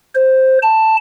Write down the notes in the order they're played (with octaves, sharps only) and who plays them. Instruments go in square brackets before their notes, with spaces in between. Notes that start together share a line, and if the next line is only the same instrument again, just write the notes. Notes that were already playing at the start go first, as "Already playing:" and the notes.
[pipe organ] C5
A5